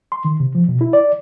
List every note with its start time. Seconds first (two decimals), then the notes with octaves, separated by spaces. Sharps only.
0.12 C6
0.25 D#3
0.40 C3
0.55 F3
0.68 B2
0.81 E4
0.93 D5